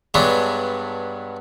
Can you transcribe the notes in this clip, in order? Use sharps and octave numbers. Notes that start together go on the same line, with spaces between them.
G2 F#3 G#3 B3 D4